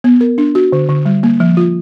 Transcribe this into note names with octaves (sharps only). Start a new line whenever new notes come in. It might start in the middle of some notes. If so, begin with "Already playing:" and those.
B3
A#4
D4
F#4
D3
D3
G3
A#3
F3
F4